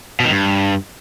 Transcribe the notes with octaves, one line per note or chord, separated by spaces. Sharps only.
B2
D#3
G2